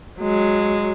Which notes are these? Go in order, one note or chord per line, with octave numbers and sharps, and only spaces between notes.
F#3 G#3